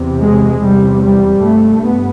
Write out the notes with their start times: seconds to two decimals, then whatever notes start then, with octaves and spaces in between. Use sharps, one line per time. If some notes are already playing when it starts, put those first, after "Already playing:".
Already playing: E2 C3
0.21 G#3
0.60 E2 C3 G3
1.01 G3
1.41 G2 A3
1.82 B3